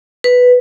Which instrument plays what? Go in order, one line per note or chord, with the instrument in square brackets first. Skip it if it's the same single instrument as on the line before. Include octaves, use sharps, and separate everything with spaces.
[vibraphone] B4